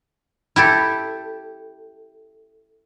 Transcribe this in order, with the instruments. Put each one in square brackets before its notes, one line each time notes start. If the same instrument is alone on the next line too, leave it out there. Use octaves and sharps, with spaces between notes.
[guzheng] E4 G4 A4